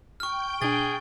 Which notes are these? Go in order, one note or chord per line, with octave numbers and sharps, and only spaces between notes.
G5 C#6 F6 G6
B2 D4 G#4 A6